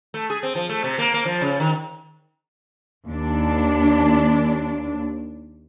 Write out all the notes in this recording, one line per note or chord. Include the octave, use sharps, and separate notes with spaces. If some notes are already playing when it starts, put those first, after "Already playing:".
A3
G#4
C4
F3
A3
C3
A#3
A#3
F3
C#3
D#3
D#2 D4